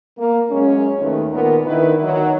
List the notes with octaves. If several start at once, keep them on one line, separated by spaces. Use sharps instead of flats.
A#3
F#2 G#3 C#4
D#2 D#3 A3 B4
A#2 D#3 B3 A#4
D3 D#3 E4 A#4 B4
D#3 F#3